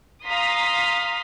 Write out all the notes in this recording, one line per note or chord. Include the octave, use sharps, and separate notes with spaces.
F5 A#5 C6 D#6 B6